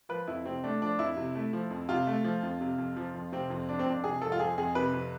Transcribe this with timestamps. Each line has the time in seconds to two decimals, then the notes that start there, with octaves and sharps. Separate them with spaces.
0.09 F3 B4
0.27 F2 E4
0.45 C3 C4
0.64 A3 D4
0.81 F3 D4
0.99 F2 E4
1.17 C3
1.35 A3
1.53 F3
1.70 F2
1.89 C3 F4
2.07 A3
2.24 F3
2.43 F2
2.61 C3
2.78 F2
2.97 F3
3.14 F2
3.32 C3 C4
3.50 F2
3.69 F3 D4
3.79 C4
3.86 F2 D4
4.04 C3 G#4
4.22 F2 A4
4.32 F4
4.39 F3 G#4
4.58 F2 G#4
4.75 C3 B4
4.93 F2